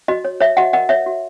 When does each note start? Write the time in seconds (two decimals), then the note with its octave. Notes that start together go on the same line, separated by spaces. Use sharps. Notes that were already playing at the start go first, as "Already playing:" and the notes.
0.08 F#4 D#5
0.25 C#5
0.40 C#5 E5
0.57 F#4 D#5 F#5
0.73 A#4 D#5 F#5
0.89 C#5 E5
1.06 F#4